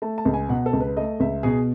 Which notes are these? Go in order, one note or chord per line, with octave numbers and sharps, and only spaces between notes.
A3 A5
A5
C#2
G#5
B2 F#5
A4
C#2
B4
A3 D#5
C#2 E5
B2 G#4